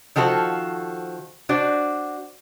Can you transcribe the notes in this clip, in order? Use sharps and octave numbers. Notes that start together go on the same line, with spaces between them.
D#3 F3 F#4 A4 C5
D4 F#4 C5 D5